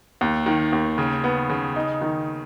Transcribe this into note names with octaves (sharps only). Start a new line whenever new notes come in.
D#2
D#3
D#2
C#3
B3
C#3
D#4
D#3